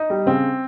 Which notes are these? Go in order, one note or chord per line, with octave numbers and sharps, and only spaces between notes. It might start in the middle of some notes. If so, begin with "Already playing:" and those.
Already playing: D#4
G3
C#3 C4